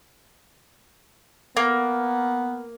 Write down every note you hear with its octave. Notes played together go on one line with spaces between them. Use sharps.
A#3 B3